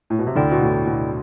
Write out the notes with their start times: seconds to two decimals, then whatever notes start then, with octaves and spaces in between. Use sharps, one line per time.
0.10 A2
0.19 B2
0.27 C3
0.35 D2 D3 E4 A4 D5 G5
0.52 B2
0.61 A2
0.87 B2